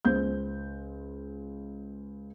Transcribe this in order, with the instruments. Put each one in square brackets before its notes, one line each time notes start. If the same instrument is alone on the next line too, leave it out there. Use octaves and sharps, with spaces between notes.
[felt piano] C#2 C5 G6